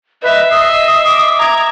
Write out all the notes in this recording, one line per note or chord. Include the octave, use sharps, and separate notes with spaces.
B4 D#5 E5
D#5 D#6 E6 C7
D6
A#5 G#6